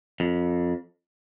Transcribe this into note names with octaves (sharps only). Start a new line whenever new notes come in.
F2